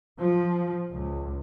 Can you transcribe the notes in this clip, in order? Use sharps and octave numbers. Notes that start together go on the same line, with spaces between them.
F3
C#2